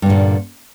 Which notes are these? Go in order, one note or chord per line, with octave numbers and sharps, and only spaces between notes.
G2 A#2 D3